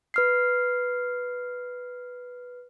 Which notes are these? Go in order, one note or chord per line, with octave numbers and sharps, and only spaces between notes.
B4 F6 C7